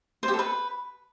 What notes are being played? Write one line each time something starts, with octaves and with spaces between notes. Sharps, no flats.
C5
G4
A4
B4